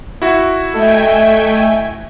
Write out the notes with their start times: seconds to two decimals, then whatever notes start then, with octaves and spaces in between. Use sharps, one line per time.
0.22 E4 F#4
0.74 A3 A4 D#5 E5 G5 G#5